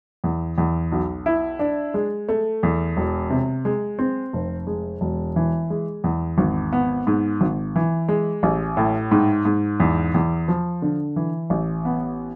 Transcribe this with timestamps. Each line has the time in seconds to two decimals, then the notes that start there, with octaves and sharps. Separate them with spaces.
0.24 E2
0.58 E2
0.92 B1
1.26 E4
1.59 D4
1.94 G#3
2.28 A3
2.63 E2
2.97 E1
3.30 C3
3.65 G#3
3.99 C4
4.33 F1
4.67 G#3
5.01 E1
5.36 E3
5.70 G#3
6.04 E2
6.38 G#1
6.73 B3
7.07 G#2
7.41 G#1
7.76 E3
8.09 G#3
8.43 A1
8.77 A2
9.11 G#2
9.45 G#2
9.80 E2
10.14 E2
10.48 F3
10.82 D3
11.16 E3
11.50 A1
11.85 B3